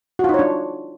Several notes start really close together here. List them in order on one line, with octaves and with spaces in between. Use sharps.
F#4 F4 D#4 C#5 D4